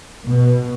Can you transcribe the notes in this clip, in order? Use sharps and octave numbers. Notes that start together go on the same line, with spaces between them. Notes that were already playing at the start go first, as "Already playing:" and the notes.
B2